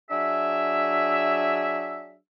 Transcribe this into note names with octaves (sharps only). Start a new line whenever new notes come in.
F#3 D4 G#4 E5